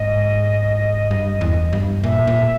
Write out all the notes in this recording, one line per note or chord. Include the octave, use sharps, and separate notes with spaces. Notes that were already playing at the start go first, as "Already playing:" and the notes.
Already playing: G#2 D#5
G2
E2
G2
A#2 E5
A#2